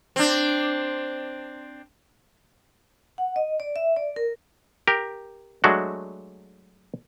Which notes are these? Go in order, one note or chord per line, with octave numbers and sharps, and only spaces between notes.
C4 D4
F#5
D#5
D5
E5
D5
A#4
G4 A#4
F#3 G#3 A3 D4 F#4